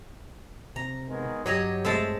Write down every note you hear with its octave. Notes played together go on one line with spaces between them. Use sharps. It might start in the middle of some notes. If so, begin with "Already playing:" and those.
C3 A#5
D#3 G#3 B3
G2 F#3 G4 C#5 D#5 A#5
G#3 A3 C4 E5 A5